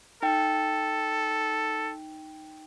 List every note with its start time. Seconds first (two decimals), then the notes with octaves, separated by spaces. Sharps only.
0.23 D#4 A4 G5